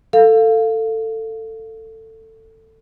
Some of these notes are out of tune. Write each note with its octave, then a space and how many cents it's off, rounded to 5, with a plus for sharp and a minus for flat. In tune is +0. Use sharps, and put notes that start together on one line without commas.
A4 +15 F5 +0